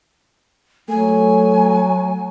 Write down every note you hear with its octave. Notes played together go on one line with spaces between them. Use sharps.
F#3 A3 G#5